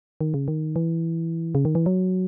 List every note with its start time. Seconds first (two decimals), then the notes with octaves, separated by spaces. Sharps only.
0.21 D#3
0.34 C#3
0.48 D#3
0.76 E3
1.55 C#3
1.65 D#3
1.75 E3
1.86 F#3